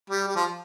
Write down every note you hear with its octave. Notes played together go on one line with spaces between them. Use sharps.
G3
G3
F3